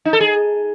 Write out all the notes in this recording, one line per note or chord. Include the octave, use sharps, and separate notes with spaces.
D#4
A4
G#4